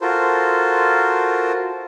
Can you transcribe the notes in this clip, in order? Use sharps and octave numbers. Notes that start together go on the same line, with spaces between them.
F4 F#4 A4 A#4 C5